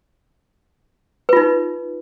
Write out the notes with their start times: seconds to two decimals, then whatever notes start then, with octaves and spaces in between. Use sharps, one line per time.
1.29 B4
1.33 F4
1.37 D#4